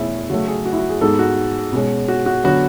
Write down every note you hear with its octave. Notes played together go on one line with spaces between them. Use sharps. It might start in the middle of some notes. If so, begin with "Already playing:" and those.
Already playing: E2 B2 A3 C#4 E4 G#4
C#3 F#3 A3 F#4
G#4
F#4
E4
F#4
G#4
G#2 G#3 B3 A4
F#4
B2 G#3 C#4
F#4
F#4
D3 F#3 B3 F#4